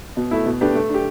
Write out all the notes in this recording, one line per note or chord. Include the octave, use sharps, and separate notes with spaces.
B2
A3 E4
B2
A3 D4 G4 B4
A3
D4 G4